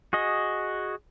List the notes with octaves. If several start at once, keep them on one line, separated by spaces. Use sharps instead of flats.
F#4 G#4 D#5